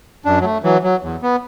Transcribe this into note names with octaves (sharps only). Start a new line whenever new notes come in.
F#2 D4
F#3
A3
E3 F#3
F#3
E2
B3